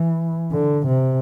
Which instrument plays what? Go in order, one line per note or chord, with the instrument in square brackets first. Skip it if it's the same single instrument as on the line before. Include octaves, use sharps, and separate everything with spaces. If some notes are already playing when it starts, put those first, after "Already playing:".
Already playing: [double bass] E3
D3
C3